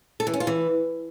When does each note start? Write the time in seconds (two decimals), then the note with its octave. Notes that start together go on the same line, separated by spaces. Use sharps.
0.20 A4
0.27 E3
0.33 C#4
0.40 F4
0.47 E3